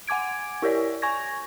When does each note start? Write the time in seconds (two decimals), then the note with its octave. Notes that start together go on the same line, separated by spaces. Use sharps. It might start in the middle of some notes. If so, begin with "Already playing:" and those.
0.07 F#5 G#5 D6 G#6 D7
0.62 E4 G4 A#4 C#5 D5
1.02 G#5 C#6 G#6 A#6